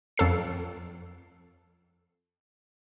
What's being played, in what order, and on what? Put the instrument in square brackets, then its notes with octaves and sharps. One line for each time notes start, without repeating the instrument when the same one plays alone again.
[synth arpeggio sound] F2 A4 C7